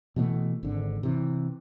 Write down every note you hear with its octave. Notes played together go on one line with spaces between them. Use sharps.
B2 E3 G#3 A3
G#1 D3
C3 E3